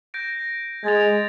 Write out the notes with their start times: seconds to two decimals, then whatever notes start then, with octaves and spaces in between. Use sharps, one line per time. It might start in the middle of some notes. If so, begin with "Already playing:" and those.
0.14 G6 A#6 D7
0.84 G#3 G#6 A6 F7